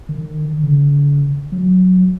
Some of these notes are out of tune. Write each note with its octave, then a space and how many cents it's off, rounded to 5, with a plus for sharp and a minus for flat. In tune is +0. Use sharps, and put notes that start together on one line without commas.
D#3 -35
D3 -40
F#3 -5